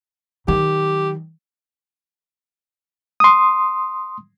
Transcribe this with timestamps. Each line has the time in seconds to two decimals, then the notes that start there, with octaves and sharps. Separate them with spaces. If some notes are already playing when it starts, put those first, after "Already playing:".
0.48 D#3 F#3 G4
3.20 C6 D#6